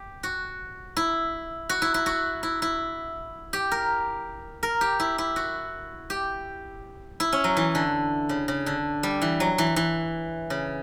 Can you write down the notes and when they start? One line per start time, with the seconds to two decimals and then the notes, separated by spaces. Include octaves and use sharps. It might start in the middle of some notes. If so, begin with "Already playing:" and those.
Already playing: G4
0.23 F#4
0.97 E4
1.69 F#4
1.82 E4
1.94 E4
2.06 F#4
2.43 E4
2.62 E4
3.53 G4
3.71 A#4
4.63 A#4
4.81 G4
5.00 E4
5.18 E4
5.36 F#4
6.10 G4
7.20 E4
7.33 C#4
7.44 F#3
7.57 E3
7.75 D3
8.29 C#3
8.48 C#3
8.66 D3
9.03 G3
9.22 E3
9.40 F#3
9.58 E3
9.76 E3
10.50 C#3